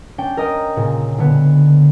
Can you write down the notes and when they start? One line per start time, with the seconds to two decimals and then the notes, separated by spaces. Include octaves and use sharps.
0.18 C#4 D4 G5
0.37 A#4 D#5 G5
0.76 A#2 C#3
1.18 D3 B3